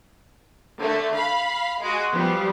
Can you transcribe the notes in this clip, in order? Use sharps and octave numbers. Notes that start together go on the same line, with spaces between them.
D3 A3
F5 B5
G#3 F#4
F3 G3 B3